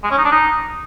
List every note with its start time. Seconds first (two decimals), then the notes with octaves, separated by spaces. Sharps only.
0.04 G#3
0.11 C#4
0.18 D#4
0.25 D4
0.32 D#4